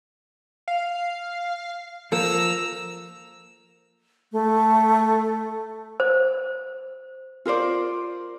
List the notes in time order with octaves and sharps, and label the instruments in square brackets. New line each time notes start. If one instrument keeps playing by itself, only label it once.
[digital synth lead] F5
[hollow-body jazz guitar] F3 A#3 A4 [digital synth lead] A#5 [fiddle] E6
[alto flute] A3
[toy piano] C5
[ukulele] F4 A#4 C5 D5